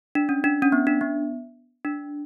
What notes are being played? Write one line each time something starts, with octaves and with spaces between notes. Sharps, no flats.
D4
C#4
D4
C#4
B3
D4
B3
D4